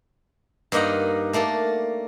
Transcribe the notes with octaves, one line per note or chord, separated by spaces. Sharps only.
G2 A#3 D#4 D#5 F#5
A3 A#3 D4 A4